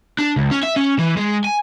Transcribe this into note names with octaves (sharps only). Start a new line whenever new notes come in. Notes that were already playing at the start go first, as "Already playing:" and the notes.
D4
C#2
C#4
E5
C#4
E3
G#3
G#5